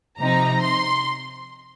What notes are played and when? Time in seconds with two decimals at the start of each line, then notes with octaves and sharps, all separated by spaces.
0.18 C3 F3 C4 D#4 A#5
0.61 C6